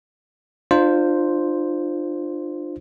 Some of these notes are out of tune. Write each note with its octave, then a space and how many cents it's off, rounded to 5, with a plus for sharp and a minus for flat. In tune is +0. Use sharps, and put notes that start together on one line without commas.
D4 +35 F4 +0 C5 +0